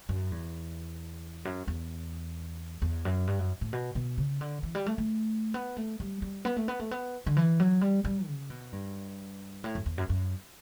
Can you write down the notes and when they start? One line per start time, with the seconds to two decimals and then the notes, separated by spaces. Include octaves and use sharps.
0.09 F#2
0.32 E2
1.45 F#2
1.68 E2
2.82 E2
3.05 F#2
3.27 G2
3.39 F#2
3.61 A2
3.73 B2
3.95 B2
4.18 C#3
4.41 D3
4.63 E3
4.75 G3
4.86 A3
4.98 A3
5.54 B3
5.77 A3
6.00 G3
6.22 G3
6.45 B3
6.57 A3
6.68 B3
6.80 A3
6.91 B3
7.26 D3
7.37 E3
7.60 F#3
7.81 G3
8.05 G3
8.27 C#3
8.50 B2
8.72 G2
9.64 A2
9.75 F#2
9.86 E2
9.98 F#2
10.09 F#2